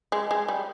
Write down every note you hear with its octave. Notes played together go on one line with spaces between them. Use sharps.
G#3
G#3
G3